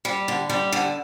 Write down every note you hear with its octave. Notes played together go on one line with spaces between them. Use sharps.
G3
D3
G3
D3